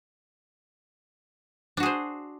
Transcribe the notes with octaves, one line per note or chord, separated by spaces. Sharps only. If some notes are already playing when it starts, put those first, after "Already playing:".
D4 F#4 G#4 C5